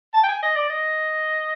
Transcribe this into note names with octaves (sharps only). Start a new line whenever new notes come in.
A5
G5
G#5
D#5
D5
D#5